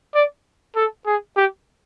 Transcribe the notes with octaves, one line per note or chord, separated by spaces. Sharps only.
D5
A4
G#4
G4